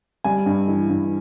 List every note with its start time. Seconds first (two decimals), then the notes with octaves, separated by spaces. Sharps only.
0.24 G3 G#5
0.46 G2
0.68 E3
0.90 G2